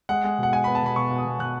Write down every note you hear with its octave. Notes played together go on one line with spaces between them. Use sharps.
G#3 F#5
G#3
B2 F#5
G#3 G#5
B5
B3
A5
B2 B5
B2 C#6
B2
D#6
B2
B2 F#6